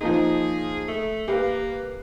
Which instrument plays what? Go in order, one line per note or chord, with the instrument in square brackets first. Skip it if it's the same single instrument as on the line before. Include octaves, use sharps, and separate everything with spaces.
[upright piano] F3 A#3 D#4 [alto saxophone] G#4
[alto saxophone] A3
[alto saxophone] A#3 [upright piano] G4 B4 F5